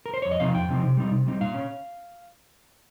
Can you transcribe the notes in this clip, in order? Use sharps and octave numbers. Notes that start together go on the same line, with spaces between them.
A#4
C5
F2 C#5
D#5
C3 F3 C4 D#4 F5
F2 G5
C3 F3 C4 D#4
C3
G3 C4 D#4
C3
G3 C4 D#4
A#2 F5
C#4